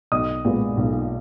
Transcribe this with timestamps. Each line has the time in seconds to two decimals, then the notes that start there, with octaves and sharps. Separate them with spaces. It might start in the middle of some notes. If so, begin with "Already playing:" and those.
0.12 B1 D#5 D#6
0.45 A#2 G#3 B3
0.77 B1